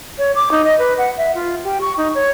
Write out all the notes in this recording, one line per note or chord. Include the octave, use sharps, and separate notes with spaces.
C#5
D6
D#4
D#5
B4
F#5
E5
F4
G4
C#6
D#4
C#5